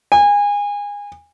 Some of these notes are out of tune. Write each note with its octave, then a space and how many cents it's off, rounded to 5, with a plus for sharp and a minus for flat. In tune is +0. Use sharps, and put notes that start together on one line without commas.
G#5 -25